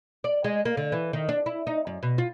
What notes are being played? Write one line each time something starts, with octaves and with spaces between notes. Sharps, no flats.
D5
G#3
A#3
D3
E3
D#3
D4
E4
D#4
F#2
B2
F4